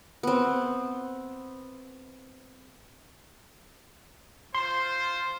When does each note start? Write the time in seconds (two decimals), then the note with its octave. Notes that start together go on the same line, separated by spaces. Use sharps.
0.23 B3 C4
4.55 F4 C5 C6